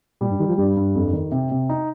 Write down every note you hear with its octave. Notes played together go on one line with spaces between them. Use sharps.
A#2 G3
G2
D#3 G4
F3
G2 G3
G2
F2
D#3
C3
C3
D#4